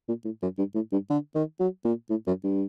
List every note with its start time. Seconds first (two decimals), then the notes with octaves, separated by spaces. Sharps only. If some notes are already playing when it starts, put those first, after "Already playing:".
0.08 A#2
0.25 A2
0.42 F#2
0.58 G2
0.75 A2
0.92 G2
1.10 D3
1.35 D#3
1.60 F#3
1.85 A#2
2.10 A2
2.27 F#2
2.44 G2